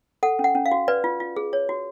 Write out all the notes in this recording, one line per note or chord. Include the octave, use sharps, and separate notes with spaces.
A4 F#5
C#4
F#5
C#4
F5
F#4
B4 D5
F4
F4
G#4
C#5
F#4